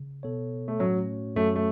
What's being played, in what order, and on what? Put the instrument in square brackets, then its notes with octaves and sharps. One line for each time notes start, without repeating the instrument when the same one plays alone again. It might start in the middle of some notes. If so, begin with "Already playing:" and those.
Already playing: [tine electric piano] C#3
B2 B3 A4 C#5
[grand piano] A3
[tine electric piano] A2 A3 C#4 F#4 C#5 [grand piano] F#3
[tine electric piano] F#2 F#3 C#4 F#4 C#5 [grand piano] A3
[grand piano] A3